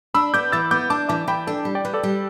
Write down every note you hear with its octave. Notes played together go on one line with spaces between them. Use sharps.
D4 B5 E6
B3 D6 G6
E3 E6 A6
B3 D6 G6
D4 A5 D6
E3 A5 D6
E3 G5 B5
D4 A4
G3
D5 G5
G3 B4
A4 D5
G3